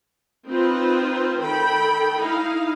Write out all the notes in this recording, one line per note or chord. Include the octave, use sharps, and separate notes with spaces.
C4 D#4 F4 B4 C5
D#3 A4 G5 B5
D#4 E4 F5